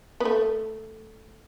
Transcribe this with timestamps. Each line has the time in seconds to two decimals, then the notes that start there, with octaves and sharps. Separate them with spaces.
0.20 B3
0.25 A3